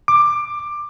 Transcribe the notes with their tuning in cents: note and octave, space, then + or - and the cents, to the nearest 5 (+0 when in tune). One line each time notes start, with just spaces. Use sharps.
D6 +15